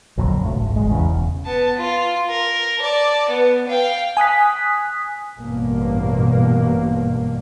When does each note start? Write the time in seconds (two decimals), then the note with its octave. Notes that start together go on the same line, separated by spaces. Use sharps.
0.17 A#1 F2 D3 F#3
0.42 C#2 A2
0.60 G#1
0.76 G#1 G#3
0.90 E2 C#3
1.07 E1
1.45 B3 A5
1.77 F4
2.29 A#4
2.78 D5 A5
3.29 B3
3.68 F5 G5
4.17 G#5 D#6 F#6 B6
5.39 A1 G2 B2 A#3